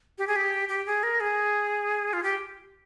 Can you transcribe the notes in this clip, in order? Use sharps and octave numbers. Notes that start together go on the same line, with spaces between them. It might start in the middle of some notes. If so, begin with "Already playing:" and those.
G4
G#4
G4
G4
G#4
A#4
G#4
F4
G4